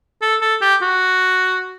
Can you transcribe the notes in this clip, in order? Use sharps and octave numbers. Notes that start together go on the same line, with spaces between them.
A4
A4
G4
F#4